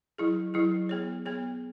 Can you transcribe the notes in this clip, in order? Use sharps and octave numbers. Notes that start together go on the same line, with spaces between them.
F#3 E4 G#4
F#3 E4 G#4
B3 G#4 C#5
B3 G#4 C#5